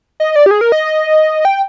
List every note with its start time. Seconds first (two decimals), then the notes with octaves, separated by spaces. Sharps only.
0.20 D#5
0.36 D5
0.46 G4
0.51 G#4
0.61 A#4
0.72 D#5
1.45 G5